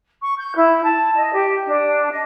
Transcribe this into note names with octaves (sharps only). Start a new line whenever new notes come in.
C#6
G6
E4
A5
D#5
G4
D4
D#5